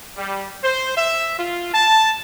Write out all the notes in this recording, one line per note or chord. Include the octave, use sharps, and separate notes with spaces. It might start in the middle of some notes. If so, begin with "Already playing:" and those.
G3
C5
E5
F4
A5